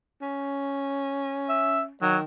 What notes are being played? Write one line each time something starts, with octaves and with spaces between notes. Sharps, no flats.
C#4
E5
D#3 F#3